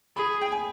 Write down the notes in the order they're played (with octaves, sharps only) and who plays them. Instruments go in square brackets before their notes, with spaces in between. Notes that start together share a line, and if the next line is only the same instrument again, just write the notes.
[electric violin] G#4 [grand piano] B5
[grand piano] G5
G#5